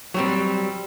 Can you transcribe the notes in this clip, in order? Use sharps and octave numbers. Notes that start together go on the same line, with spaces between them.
F#3 G3 C4